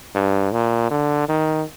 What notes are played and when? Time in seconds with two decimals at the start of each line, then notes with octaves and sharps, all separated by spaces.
0.15 G2
0.52 A#2
0.90 D3
1.29 D#3